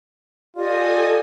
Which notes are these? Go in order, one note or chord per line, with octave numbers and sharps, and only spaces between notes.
F4 G4 A4 D5 D#5 G#5 D#6